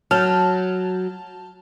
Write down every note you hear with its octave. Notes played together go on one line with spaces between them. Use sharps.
F#3 A5 F6 G6